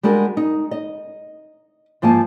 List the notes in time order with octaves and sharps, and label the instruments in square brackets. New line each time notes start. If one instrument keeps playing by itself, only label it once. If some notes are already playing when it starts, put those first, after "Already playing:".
[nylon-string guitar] G3 G#3 D4 F#4 A#4
D#4
D#5
G#2 F3 A#3 G#5 A5